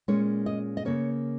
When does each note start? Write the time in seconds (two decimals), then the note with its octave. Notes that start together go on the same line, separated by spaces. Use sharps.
0.08 A#2 G#3 C#4 C#5
0.46 D#5
0.77 D#5
0.85 C#3 A#3 C#4 C#5